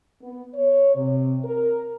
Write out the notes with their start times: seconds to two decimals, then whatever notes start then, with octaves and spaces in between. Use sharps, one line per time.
0.22 B3
0.54 C#5
0.96 C3
1.44 A#4